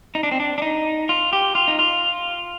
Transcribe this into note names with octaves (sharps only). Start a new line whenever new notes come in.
D#4
D4
C4
D4
D4
D#4
F4
G4
F4
D#4
F4